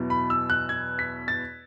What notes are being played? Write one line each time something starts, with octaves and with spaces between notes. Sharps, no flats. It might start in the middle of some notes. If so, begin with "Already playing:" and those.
Already playing: E2 B2 F#3 B3 E4
B5
E6
F#6
G#6
B6
A6